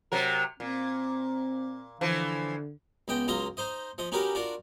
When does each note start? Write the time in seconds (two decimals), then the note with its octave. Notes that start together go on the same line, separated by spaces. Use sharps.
0.12 C3 F#3 A#4
0.60 A#2 C4
2.01 D3 E3 F3
3.08 C#2 B3 D#5 G5
3.28 C#2 F#3 F4 D#5 A#5 C6
3.57 D#4 C5 D#5
3.98 F3 D#5
4.12 C#4 D#4 F#4 G4 A#4 B4
4.35 D4 F4 F#4 A#4